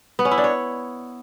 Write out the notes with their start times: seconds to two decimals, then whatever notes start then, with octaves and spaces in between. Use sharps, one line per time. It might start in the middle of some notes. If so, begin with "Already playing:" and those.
0.19 B3
0.25 C#4
0.31 E4
0.38 D4
0.44 C#5